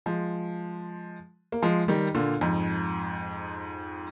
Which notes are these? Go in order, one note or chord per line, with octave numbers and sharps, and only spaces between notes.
F3 G#3
A#3
F3 G#3
D#3 G3
A#2 D3
F2 G#2